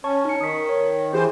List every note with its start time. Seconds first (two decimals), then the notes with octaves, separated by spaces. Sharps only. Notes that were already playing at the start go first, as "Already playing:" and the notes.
0.04 C#4 C#5 A5 C#6
0.25 D#4 C#7
0.41 D#3 D#6 B6
0.69 C#5
1.13 E3 E4 G4 G#4 C5